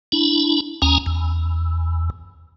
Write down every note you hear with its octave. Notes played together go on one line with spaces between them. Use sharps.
D4 E4
D#2 C#4 G#5 A#5
E2